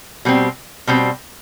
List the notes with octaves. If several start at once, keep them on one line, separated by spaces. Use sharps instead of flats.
B2 G3 C4
B2 G3 C4